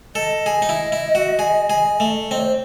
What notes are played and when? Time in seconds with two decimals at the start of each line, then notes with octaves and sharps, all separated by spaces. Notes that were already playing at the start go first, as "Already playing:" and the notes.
0.15 A4 D#5
0.46 G#4
0.62 D#4
0.69 E4
0.92 E4
1.15 F#4
1.39 G#4
1.70 G#4
2.00 A3
2.31 C4 D#5
2.39 C#5
2.45 C5